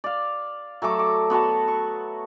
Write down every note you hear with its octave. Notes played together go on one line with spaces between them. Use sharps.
D5 F5
F#3 A3 A4 D6
D6
B3 F#4 C#5 A5
C#6